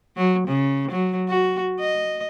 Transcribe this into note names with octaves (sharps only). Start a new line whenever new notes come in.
F#3
C#3
F#3
F#4
D#5